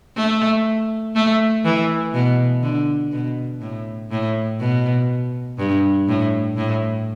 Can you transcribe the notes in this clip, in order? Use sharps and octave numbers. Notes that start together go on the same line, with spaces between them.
A3
A3
E3
B2
D3
B2
A2
A2
B2
G2
A2
A2